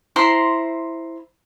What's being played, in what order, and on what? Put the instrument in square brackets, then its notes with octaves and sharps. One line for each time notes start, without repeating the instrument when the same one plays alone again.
[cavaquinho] E4 C5 A#5 C6